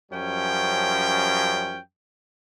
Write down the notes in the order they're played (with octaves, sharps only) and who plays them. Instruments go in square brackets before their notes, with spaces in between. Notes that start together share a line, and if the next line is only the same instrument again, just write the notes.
[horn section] F#2 F3 G3 C#4 G5